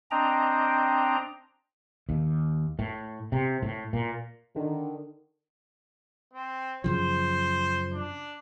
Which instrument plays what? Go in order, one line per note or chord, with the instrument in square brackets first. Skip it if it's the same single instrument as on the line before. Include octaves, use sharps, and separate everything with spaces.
[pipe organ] C4 D4 D#5 G5 A#5
[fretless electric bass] D#2
A2
C3
A2
A#2
[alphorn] D3 [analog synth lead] D#3
[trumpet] C4
[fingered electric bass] F#2 C#3 F3 [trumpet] C5
[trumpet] D4